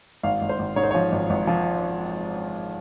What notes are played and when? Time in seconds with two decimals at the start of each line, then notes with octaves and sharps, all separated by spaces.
0.23 G#1 F5
0.42 G#1
0.49 C5
0.59 G#1
0.76 G#2 C#5
0.83 C5
0.91 F3 C#5
1.12 G#1
1.30 G#1
1.47 F3